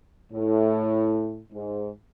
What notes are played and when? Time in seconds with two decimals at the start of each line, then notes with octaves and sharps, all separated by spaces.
0.31 A2
1.52 G#2